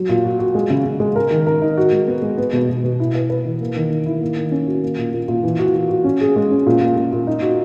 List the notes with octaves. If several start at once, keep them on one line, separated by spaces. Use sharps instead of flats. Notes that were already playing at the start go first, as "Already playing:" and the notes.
Already playing: F#3 F#4
A#2
F#4
F#4
G#3
C#3
C#3
G#3
A#4
D#3
A#4
D#4
F#4
G#3
B3
G#3
B3
B2
B2
B2
E4
B4
B4
E3
A#3
D#3
D#3
E4
A#3
D#3
C#4
F#4
A#3
A#2
A#2
A#2
E3
F#4
F#4
F#4
C#4
G#4
G#3
C#4
A#2
A#2
A#2
A#2
D#4
F#4